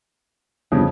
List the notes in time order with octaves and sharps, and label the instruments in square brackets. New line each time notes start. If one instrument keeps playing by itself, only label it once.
[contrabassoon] G1 [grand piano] F2 C#3